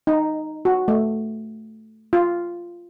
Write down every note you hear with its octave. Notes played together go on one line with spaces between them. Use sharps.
D#4
F#4
A3
F4